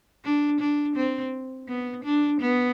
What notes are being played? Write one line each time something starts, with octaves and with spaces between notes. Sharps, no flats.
D4
D4
C4
B3
D4
B3